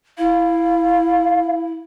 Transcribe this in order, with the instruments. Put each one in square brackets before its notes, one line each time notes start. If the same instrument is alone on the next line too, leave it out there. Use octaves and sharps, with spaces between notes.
[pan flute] E4 [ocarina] F5